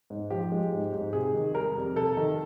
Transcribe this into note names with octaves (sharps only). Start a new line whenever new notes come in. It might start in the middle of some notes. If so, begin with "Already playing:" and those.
G#2
F3 G4
G#3
G#2
G#2
C3 G#4
D#3
G3 A#4
F2
C3 A4
D#3